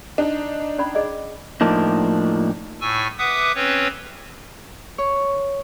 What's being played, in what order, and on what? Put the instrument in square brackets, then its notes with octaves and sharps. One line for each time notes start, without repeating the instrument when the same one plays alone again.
[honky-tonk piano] D4 D#4
[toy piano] C#4 D5 B5
G#4 D5 D#5
[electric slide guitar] A2 F3 A#3 D4 D#4
[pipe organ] A2 G#5 C#6 E6
B4 E5 F#5 D6 D#6
C4 C#4 B4 C#5
[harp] C#5